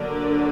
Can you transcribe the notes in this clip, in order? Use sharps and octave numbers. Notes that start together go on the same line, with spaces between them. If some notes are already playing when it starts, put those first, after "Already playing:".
Already playing: D3 F#3 A#3 D4 A#4